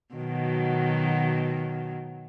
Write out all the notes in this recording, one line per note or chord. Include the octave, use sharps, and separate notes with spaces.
B2 D#3 F#3